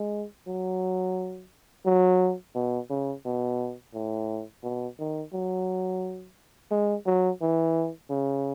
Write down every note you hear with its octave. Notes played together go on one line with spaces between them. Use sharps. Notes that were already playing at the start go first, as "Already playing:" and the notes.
Already playing: G#3
F#3
F#3
B2
C#3
B2
A2
B2
D#3
F#3
G#3
F#3
E3
C#3